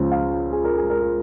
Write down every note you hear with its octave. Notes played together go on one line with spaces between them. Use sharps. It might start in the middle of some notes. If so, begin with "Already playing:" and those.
Already playing: C#2 C#3 F3
F5
G#4
A#4
G#4
A#4
G#4